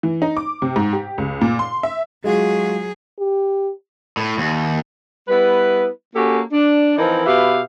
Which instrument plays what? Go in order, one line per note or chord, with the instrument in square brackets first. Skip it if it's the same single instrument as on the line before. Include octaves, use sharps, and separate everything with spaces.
[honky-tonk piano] E3
D#4
D6
C3
G#2
G4
C#2
A#2
C6
E5
[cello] F#3 G#4 [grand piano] G#3 F4 F#4
[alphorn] G4
[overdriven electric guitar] A2
D#2
[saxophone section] G3 B3 E4 B4
A#3 C#4 F#4 G4 A4
D4
E3 F3 C4 D#4 A#4
B2 F4 G4 B4 E5 F5